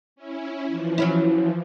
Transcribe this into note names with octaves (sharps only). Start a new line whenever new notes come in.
C#4 E4
E3 F3
F#3 C#4 E4